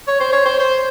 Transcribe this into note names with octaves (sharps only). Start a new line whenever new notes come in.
C#5
C5
C#5
C5
C5